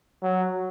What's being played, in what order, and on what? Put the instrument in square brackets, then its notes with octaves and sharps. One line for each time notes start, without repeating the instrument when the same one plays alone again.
[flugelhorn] F#3